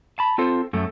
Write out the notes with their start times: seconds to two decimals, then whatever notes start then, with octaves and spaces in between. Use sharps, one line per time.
0.19 A5 B5
0.38 C4 F4 A4 C5
0.73 F#2 A3